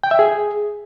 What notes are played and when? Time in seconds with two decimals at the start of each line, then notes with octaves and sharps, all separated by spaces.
0.04 G5
0.11 E5
0.19 G#4